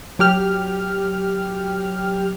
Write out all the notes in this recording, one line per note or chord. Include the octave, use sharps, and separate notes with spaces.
F#3 G4 F6